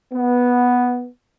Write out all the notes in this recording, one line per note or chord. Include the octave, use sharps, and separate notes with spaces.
B3